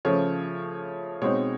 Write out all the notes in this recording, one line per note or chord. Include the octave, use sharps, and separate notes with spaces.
C#3 F3 A3 C#5
B2 G#3 C4 D#4 C#5